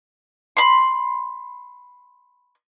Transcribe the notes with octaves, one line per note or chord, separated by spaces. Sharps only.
B5 C6